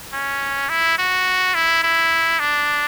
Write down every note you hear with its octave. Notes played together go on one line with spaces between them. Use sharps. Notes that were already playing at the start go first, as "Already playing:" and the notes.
C#4
E4
F#4
E4
E4
D4